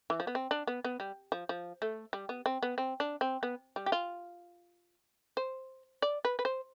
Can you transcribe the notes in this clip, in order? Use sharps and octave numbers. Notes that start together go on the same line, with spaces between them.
E3
F3
B3
C4
D4
B3
B3
G3
F3
F3
A3
G3
B3
C4
B3
C4
D4
C4
B3
G3
G4
F4
C5
D5
B4
B4
C5